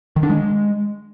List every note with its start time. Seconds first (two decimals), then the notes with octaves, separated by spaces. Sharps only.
0.16 D#3
0.23 D4
0.30 G#3